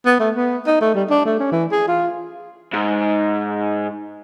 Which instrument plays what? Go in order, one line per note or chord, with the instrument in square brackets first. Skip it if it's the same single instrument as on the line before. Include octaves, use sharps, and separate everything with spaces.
[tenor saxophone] B3
A3
B3
D#4
A3
G3
D4
A3
C#4
E3
G#4
F4
[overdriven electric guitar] G#2